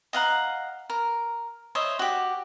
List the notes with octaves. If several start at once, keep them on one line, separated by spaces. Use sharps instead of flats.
D#5 F5 F#5 A#5
A#4
C5 C#5 D#5 E5
F#4 G4